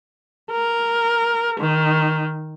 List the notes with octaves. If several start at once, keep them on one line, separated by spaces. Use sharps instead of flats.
A#4
D#3